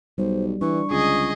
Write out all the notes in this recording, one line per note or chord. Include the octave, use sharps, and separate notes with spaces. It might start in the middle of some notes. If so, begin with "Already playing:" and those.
B1 G3 C5
E3 D4 C#6
C#2 D3 G#4 D#5